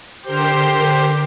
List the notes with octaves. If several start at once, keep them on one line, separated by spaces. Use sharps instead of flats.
D3 G4 A#4 C5 C6